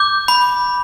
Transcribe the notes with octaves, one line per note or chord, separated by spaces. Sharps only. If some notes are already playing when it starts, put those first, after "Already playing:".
Already playing: D6 G6
B5